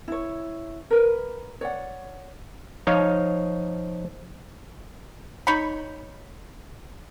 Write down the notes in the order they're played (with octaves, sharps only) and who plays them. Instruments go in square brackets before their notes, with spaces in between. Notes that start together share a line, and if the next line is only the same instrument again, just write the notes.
[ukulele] E4 C#5
A#4 B4
C#5 D5 F#5
[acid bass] F3 [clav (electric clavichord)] D#4 C#5 F5
[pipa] D#4 C#5 B5